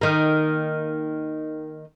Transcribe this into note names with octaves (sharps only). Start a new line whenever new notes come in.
D#3 A#3